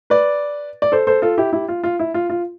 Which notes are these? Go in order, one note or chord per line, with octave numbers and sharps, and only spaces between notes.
B4 D5
D5
A4 C5
A4 C5
F4 A4
E4 G4
E4 G4
F4
F4
E4
F4
F4